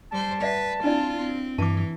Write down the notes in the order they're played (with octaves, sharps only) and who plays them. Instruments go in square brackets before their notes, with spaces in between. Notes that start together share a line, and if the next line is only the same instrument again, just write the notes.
[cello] G3 C5 [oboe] A5
[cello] B4 [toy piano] D5 E5 F#5
[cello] C4 F4 [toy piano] D4 E4 D5
[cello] C4
[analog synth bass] G2 [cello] E3 [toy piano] A5 D6